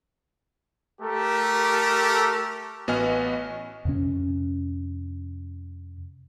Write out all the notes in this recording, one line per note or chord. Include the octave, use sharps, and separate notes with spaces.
A3 G4 A4 A#4
A1 B3 F#4 D#5 G#5 F6
F2 C3 C#4